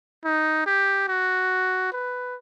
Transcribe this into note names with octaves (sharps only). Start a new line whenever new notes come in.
D#4
G4
F#4
B4